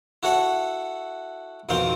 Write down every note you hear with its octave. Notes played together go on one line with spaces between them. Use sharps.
E4 F#4 A4 C#5 F#5
B1 F2 D#3 C4 F5 G5